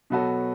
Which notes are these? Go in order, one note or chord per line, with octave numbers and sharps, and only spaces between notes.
B2 F#3 B3 F#4 A4